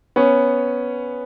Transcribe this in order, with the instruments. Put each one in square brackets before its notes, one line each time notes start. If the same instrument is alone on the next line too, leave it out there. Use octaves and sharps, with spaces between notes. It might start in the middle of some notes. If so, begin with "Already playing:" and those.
[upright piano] B3 C#4